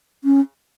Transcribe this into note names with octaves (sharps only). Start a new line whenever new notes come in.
C#4